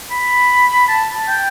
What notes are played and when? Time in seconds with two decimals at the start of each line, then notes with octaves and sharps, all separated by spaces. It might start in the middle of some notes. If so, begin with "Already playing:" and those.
0.11 B5
0.88 A5
1.28 G5